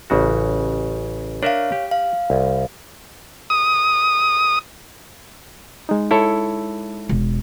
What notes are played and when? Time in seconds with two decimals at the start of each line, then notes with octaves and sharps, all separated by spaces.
0.10 A1 C#3 F#4
1.43 D4 A#4 C#5 E5 F5
1.72 G4
1.91 F5
2.30 C2
3.50 D#6
5.89 G#3 D#4
6.11 E4 A4 C#5
7.09 E1